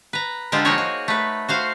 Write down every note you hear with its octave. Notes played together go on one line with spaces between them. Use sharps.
B4 A#5
D3 G#3 F4 G4 A4
F3 A#3 D#4 F#4 G#4 C#5
F#4
A3 B4
F#4 C5 F5